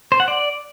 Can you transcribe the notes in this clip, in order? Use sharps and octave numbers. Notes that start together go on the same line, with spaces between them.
C5
F#5
D5